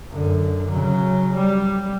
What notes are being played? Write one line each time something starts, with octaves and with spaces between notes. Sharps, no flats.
F#2 D3
C#3 F#3
G3